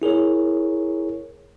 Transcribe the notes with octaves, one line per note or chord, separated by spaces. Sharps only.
E4 G#4 A#4 C#5